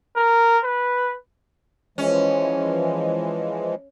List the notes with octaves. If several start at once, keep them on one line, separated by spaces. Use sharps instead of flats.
A#4
B4
E3 F3 G#3 C#4